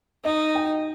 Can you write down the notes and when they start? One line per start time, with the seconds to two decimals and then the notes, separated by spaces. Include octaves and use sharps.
0.24 D#4 D#5
0.55 G5